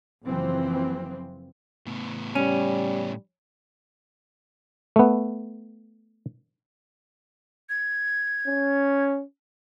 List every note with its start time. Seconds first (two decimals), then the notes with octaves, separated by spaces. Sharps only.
0.25 F#1 E3 F3 C4
1.86 A2 B3
2.35 G3 C#4
4.96 A3 B3
7.69 G#6
8.47 C#4